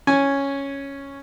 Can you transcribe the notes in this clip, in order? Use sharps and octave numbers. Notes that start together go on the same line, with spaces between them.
C#4 G#5